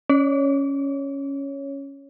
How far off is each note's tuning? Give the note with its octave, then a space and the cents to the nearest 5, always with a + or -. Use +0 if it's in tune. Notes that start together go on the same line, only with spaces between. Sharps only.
C#4 +0 C#5 +0